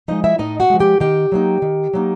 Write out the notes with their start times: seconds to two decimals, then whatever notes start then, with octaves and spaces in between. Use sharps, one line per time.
0.08 F3 G#3 D#4 D#5
0.24 E4 E5
0.38 A2 D#4 D#5
0.60 F#4 F#5
0.70 F3 G#3
0.80 G4 G5
1.00 D#3 G4 G5
1.32 F#3 A#3 D#4
1.62 D#3
1.93 F#3 A#3 D#4